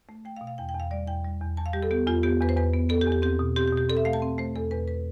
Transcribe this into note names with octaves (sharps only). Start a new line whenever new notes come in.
A3
A3 G5
F5
B2
F5
E2 G5
G5
E2
F5
G3 D5
E2 G5
G3
E2
E2 A5
F5
G3 G4
A4
B3 G4
E2 F4
B3 G4
E2 B4
C5
E2 B4
B3
B3 A4
G4
E2
G4
C4 G4
B2
C4 G4
G4
B2
G4
C4 A4
E5
A3 F5
A5
C4
A3 C5
E2 A4
E2 B4
B4